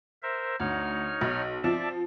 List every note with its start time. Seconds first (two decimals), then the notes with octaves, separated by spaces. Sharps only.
0.22 A#4 C5 E5
0.60 D2 D#4 C#5 F6
1.21 B1
1.63 F3 C4 D5 E5 A5